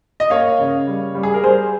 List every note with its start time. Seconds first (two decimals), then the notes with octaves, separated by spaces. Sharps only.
0.20 D#5
0.30 A#3 C#5 F5
0.59 C#3
0.87 G3
1.15 G3
1.23 G#4
1.34 A#4
1.44 G3 G#4 C5